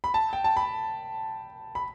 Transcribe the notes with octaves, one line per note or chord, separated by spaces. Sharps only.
B5
A5
G5
A5
B5
B5